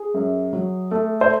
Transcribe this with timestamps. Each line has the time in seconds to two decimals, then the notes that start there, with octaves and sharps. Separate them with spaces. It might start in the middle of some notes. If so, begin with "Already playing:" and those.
Already playing: G#4
0.14 F#2
0.53 F#3
0.91 A3
1.21 C5